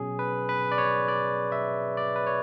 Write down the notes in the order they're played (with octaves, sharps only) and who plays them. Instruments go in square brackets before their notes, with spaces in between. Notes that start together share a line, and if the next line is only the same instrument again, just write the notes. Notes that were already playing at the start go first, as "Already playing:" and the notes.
Already playing: [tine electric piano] B2 F#3 C#4 G#4
B4
B4
D5
C#5
D5
E5
D5
B4
C#5